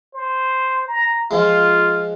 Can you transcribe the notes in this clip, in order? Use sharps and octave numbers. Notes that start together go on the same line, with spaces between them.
C5
A#5
F3 G#3 F4